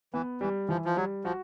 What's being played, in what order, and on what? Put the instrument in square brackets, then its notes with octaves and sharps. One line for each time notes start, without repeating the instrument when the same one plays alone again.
[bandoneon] E3 [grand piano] B3
[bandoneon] E3 [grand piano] G3
[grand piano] E3 [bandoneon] F3
[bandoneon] F3
[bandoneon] F#3 [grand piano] G3
[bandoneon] F3 [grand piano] F#4